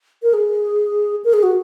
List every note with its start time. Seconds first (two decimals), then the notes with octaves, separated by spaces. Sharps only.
0.23 A#4
0.34 G#4
1.24 A#4
1.33 G#4
1.43 F#4